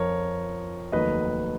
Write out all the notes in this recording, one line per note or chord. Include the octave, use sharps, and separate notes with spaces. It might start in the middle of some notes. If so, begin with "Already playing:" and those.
Already playing: F2 F3 A#4 C#5
F1 D#2 D#3 F#3 B4 D#5